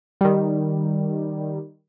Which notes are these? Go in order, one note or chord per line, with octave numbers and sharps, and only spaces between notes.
D#3 G3